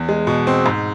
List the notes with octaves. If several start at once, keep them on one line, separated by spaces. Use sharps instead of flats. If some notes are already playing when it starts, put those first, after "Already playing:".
Already playing: E2
G#3
B2
C4
G#2